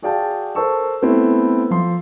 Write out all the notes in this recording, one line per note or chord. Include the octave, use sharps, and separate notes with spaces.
F#4 G#4 D5 F5 G5 A5
A4 A#4 C5 A5 C#6 E6
A3 B3 C4 E4
F3 C6